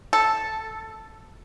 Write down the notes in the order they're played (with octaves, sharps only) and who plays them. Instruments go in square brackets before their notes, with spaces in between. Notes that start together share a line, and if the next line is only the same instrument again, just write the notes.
[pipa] A4